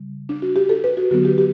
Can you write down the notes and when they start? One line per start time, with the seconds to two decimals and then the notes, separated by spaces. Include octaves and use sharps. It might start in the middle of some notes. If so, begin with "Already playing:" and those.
Already playing: C#3 G3
0.29 D4
0.42 F#4
0.56 G4
0.69 A4
0.84 B4
0.97 F#4
1.11 D3 F#3 B3 F#4
1.25 G4
1.38 G4